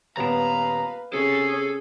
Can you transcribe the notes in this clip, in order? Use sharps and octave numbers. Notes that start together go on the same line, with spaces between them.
D#1 B3 B4 F5 A#5 E7
C3 C#4 G#4 A4